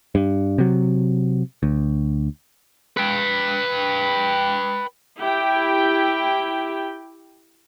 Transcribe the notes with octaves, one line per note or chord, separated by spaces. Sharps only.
G2
C3 F#3
D2
B4 G5
E4 G4 G5